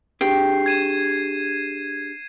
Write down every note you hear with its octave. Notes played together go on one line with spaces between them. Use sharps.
D4 G4 G#4 G5 C7
G#6 D#7 E7